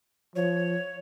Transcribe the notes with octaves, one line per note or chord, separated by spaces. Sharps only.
F3 C#5